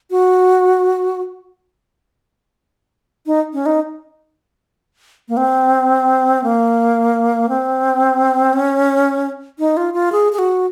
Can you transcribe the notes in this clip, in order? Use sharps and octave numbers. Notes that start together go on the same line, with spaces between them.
F#4
D#4
C#4
D#4
A#3
C4
A#3
C4
C#4
D#4
F4
F4
G#4
G#4
F#4